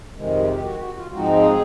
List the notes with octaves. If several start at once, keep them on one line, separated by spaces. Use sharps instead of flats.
F2 C3 D#3 G#3
G4
G4
F#4
F#4
F4
G#2 F3 G#3 C4 D#4 F#4
G#4